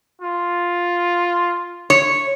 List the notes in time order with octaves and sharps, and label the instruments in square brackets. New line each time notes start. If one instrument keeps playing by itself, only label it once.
[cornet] F4
[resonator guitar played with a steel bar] C#5